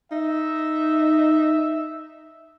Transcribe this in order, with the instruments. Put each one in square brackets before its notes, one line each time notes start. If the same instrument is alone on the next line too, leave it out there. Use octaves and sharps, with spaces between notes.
[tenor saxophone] D#4 [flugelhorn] E5